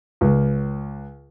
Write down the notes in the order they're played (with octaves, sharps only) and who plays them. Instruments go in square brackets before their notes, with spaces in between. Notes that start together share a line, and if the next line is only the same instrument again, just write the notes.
[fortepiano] C#2